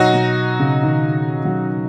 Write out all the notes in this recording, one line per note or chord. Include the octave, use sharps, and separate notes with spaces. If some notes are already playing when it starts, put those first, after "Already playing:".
Already playing: B2 F#3 D#4 F#4
B2
C#3
D#3
F#3